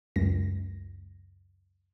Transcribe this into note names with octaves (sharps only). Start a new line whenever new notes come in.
C#2 F#2 A#6